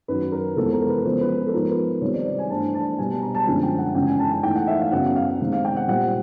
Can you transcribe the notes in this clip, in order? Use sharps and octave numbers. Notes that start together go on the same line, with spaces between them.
F#2 D#3 F#3 B4
A#4
F2 C3 E3 G#3 B3 A4
A#4
B4
C#3 F3 G#3 B3 C5
B4
A#4
A4
G#2 F3 G#3 B3 A#4
B4
C3 D#3 G3 C4 C#5
D5
D5
G#5
G2 E3 A3 C4 A5
A5
B2 G3 B3 G#5
A5
A#5
A5
F#2 D3 F3 G#3 G#5
G5
F#5
F#2 C#3 E3 G#3 G5
G#5
A5
G5
G#2 E3 A3 G5
F#5
E5
F5
F#2 C#3 F#3 B3 F#5
F5
C3 D#3 G#3
F5
G5
F#5
A#2 G3 C4 F#5